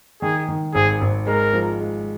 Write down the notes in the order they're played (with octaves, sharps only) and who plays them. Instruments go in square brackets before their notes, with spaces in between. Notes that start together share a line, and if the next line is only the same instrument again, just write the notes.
[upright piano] D#3 [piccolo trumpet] G#4
[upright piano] D#3
[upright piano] G#1 [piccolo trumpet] G#4
[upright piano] G#1
[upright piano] G#3 [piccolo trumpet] A#4
[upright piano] F3
G#3